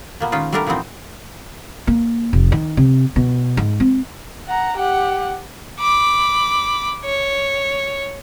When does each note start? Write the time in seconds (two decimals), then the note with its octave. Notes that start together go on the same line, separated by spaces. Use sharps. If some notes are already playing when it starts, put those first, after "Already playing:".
0.20 A#2 A#3 B3
0.32 D#3 G#3 C#4 D#4 F4
0.52 G3 A3 B3 D4 G4 A#4
0.67 A#2 E3 F3 B3 C4 D#4
1.87 A#3
2.33 F1
2.52 D#3
2.77 C3
3.16 B2
3.57 G#2
3.80 C4
4.47 F#5 A#5
4.77 G4 F#5
5.79 B5 D6
7.04 C#5